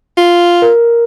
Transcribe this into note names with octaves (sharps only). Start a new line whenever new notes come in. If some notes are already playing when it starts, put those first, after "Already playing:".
F4
A#4